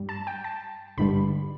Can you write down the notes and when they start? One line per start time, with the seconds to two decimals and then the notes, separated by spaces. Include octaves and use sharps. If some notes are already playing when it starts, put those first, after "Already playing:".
Already playing: G2 G3
0.09 A5
0.27 G5
0.44 A5
0.97 G1 G2 D3 G3 B5